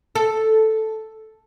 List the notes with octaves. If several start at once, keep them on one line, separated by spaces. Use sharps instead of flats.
A4